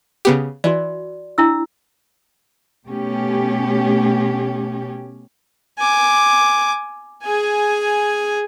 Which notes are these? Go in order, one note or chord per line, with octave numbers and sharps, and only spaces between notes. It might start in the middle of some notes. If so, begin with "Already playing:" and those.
C#3 B3 G4
E3 F#4 D5
D4 E4 E6
B2 A3 C#4 G4
G#5 D6
G#4 G#5